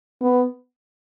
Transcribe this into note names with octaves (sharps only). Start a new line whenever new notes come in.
B3